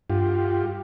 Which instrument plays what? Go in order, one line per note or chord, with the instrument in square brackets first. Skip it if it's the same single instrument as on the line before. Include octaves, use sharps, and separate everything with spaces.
[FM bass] G2 [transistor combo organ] F4 G4